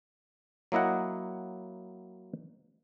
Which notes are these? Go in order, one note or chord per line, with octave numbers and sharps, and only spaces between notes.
F#3 A#3 E4 D#5 F#5